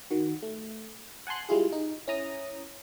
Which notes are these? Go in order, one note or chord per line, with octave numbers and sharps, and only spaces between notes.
D#3 F#4
A3
F#5 G#5 A5 C6 F#6
G3 G#3 E4 F4 G#4
D#4
C#4 E4 A#5 D#6